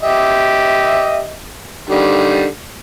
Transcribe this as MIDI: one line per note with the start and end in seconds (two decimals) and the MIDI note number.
0.03 1.33 67
0.03 1.33 75
0.03 1.33 76
1.90 2.46 50
1.90 2.46 51
1.90 2.46 55